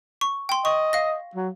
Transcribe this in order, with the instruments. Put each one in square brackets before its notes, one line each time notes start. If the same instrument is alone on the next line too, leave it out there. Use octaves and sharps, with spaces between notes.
[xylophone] C#6
G5 C6
[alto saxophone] D#5 [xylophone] C#6
[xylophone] F5 A#6
[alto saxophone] F#3